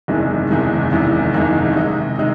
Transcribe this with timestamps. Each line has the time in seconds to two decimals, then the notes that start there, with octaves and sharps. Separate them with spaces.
0.08 F#1 E2 C3 D#3 G#3
0.51 F#1 E2 C3 D#3 G#3
0.92 F#1 E2 C3 D#3 G#3
1.34 F#1 E2 C3 D#3 G#3
1.76 C3 D#3 G#3 D#4
2.18 C3 D#3 G#3 D#4